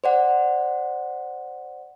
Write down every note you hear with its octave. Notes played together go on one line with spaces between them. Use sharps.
C5 D5 F#5